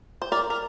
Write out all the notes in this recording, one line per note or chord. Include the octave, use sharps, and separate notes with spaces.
C5
A#4 D5
A#4